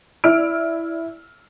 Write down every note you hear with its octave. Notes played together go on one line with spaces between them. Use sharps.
E4 D5 E6 F6 D7